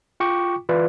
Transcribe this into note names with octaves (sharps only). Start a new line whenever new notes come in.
F4 G5 C#6 D6
E3 E4 F4 B4 D5